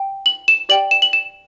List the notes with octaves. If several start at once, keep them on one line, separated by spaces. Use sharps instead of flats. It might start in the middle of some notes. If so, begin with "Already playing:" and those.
Already playing: G5
F#7
E7
G4 D5 G5 F#7
E7
F#7
E7